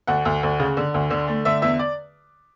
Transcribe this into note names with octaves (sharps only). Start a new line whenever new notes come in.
D2 F#5
D2
D2
C#3
D3
D2
D3
A3
D3 E5
E2 E5
D5